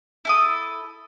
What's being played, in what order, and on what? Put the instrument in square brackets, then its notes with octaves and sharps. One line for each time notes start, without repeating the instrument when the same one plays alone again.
[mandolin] E4 A4 D#6